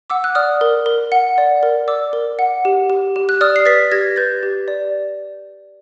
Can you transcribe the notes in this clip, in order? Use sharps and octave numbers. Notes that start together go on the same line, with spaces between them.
F#5 D6 E6
F#6
D5 D#6 F6
A#4
A#4
F#5
D5
A#4
D5 D6 E6
A#4
F#5
G4
G4
G4
F#6
D5 D#6 F6
C7
B4 A6 B6
G4 G#6 A#6
B4 G6 A6
G4
D5